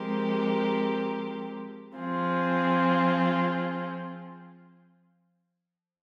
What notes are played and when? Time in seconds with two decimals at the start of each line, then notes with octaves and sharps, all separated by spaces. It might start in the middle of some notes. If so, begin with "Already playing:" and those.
Already playing: F3 G#3 C4 G4 A#4
1.96 F3 C4 F4 G#4